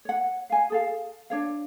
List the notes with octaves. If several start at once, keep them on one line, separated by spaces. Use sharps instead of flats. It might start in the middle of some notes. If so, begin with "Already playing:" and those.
C#5 F#5
F5 G#5
G#4 A4 F5
D4 C#5 F5